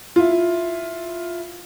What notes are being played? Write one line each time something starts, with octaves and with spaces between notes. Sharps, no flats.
E4 F4